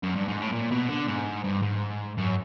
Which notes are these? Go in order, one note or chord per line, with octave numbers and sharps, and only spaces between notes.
F#2
G2
G#2
A2
A#2
B2
D3
G#2
G2
G#2
F#2